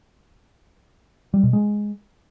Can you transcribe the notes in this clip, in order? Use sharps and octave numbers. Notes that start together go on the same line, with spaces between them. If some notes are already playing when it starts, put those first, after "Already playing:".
G3
B2
G#3